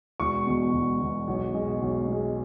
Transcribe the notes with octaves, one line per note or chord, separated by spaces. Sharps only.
E1 C#6
E2 B2
E1
E2 B2
B1
B2 G#3
B1
B2 G#3